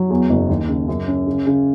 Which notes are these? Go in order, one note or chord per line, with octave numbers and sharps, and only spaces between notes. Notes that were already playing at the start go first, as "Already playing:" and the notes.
Already playing: F#3
E2
F#1
D#2
C#3
F#2
C#4
C#3
C#3